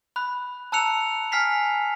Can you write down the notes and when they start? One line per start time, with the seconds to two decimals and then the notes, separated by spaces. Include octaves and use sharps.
0.16 B5 F#6
0.72 A5 A#5 E6 F#6 C#7 F7
1.32 G#5 F6 B6 C7 F7